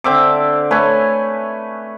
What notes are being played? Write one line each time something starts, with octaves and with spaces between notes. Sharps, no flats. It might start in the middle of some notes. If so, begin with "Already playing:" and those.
D3 C4 E5 D6
A3 B4 C#5 G#5